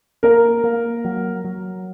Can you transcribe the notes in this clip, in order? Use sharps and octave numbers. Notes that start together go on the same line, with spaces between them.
A#3 A#4
A#3
F#3
F#3